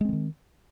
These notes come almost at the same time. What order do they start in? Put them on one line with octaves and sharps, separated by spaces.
G#3 C4 E3 D#3